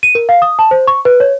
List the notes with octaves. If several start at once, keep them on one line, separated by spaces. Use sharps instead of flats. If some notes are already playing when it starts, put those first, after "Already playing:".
D#7
A#4
F5
D#6
A5
C5
C#6
B4
C#5